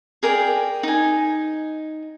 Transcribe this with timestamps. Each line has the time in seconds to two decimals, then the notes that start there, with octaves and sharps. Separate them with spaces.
0.23 G#4 A#4 D5 G5
0.83 D#4 G#5